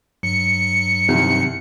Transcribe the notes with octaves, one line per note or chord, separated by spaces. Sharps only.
G2 F#3 C#7
C2 C3 D#3